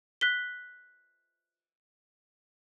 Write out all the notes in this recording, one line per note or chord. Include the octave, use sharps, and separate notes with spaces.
F#6 B6 G7